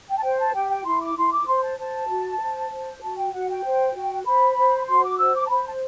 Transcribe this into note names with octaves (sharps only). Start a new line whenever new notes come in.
G5
A5
C5 G5
A5
G4 G5
G5
E4 C6
D6
E4 C6
D6
C5 C6
A5
C5 A5
F#4
C5
C5
F#4 A5
G5
F#4 F#5
G5
C5
F#4
C5 B5
C5
F#4 C6
D6
C5 E6
D6
A5
C5 B5
A5